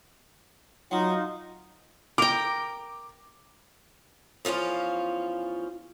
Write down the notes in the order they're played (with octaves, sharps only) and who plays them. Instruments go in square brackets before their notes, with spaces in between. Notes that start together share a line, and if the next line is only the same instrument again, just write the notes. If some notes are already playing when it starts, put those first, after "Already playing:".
[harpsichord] F#3 [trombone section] D#4 F4
[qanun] A#4 G5 [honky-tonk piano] D6
[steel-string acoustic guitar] E2 F3 C#4 F4